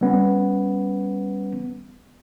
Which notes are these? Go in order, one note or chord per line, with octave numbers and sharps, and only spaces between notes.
G3 B3 C#4